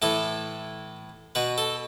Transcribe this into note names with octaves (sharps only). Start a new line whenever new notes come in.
A2 E3 A4
B2 B4
A4